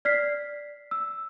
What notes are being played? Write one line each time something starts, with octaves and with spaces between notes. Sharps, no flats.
D5 F6 B6 C7
E6